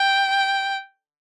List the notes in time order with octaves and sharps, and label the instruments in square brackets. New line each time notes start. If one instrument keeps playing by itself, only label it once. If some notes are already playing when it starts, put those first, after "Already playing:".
Already playing: [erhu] G5